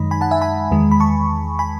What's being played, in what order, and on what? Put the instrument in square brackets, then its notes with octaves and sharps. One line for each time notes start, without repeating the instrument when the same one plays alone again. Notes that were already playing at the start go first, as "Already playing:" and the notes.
Already playing: [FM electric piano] F#2 D#3 G#3 D#4 B5
G#5 B5
F#5 A5
E5 G#5
G#5 B5
E2 D#3 G#3
B5
A5 C#6
G#5 B5